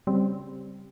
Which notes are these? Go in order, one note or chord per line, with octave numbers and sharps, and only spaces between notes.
C#3 G3 C4